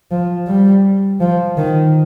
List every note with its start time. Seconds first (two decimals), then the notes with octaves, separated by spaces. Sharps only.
0.11 F3
0.48 G3
1.20 F3
1.57 D#3